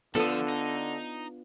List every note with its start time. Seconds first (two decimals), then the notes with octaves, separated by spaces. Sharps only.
0.15 D3 F3 B3 D4 F4 A4 D#6
0.49 D#4